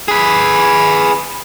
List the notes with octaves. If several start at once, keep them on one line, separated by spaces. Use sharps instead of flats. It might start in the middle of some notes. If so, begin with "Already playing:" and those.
G#4 B4